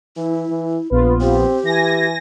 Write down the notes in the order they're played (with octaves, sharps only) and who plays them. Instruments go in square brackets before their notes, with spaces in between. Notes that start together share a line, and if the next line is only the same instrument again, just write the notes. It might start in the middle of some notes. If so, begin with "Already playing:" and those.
[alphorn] E3 [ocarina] E4
[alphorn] E3
[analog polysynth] A#1 B3 F4 [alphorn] B4
[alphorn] C4 [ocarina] G4
[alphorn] E3 [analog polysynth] G#5 A#6